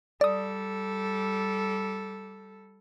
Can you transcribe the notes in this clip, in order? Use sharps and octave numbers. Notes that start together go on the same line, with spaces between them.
G3 A4 D5 D#6